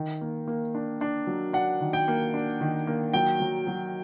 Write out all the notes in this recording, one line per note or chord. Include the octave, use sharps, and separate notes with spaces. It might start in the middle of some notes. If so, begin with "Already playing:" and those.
Already playing: D#3
A#3
A#3
D4
D4
F#3
D4 F#5
D#3
G5
A#3
D4
D#3
A#3
F#3 G5
F#3
F#3